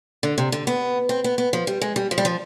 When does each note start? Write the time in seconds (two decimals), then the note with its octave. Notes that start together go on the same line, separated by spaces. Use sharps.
0.23 D3
0.38 C3
0.52 D3
0.67 B3
1.09 C4
1.24 B3
1.38 B3
1.53 F3
1.67 G3
1.81 G#3
1.96 G3
2.11 F3
2.18 G3
2.25 F3